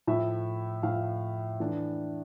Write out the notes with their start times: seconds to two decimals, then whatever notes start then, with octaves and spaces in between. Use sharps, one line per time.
0.07 A2 F3 A3 E5
0.83 A2 F3 A3 F5
1.60 E3 A3 D4